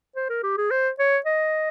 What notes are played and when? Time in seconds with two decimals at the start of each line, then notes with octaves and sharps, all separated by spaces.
0.16 C5
0.29 A#4
0.43 G4
0.58 G#4
0.71 C5
0.99 C#5
1.26 D#5